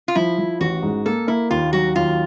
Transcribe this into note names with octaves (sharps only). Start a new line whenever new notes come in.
F4
F3 E4
F3
A1 F#4
G#2
A#3 A4
A#3 E4
D#2 F4
F#3 F#4
D#2 F4